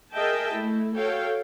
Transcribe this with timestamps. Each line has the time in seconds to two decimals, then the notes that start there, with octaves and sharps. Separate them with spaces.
0.13 G#4 A#4 D#5 E5 G5 A5
0.52 A3 E4
0.95 F#4 A4 C#5 F5 G5